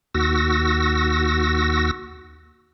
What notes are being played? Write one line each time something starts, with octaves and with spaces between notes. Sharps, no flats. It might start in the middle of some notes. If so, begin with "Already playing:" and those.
D#2 F#4 E6 A#6